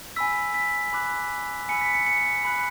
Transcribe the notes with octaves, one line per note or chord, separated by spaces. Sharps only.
G#5 B5 E6 B6
B6
B5 D6 F#6
G#5 B5 E6 C#7
B6
C#7
C#7
B5 F#6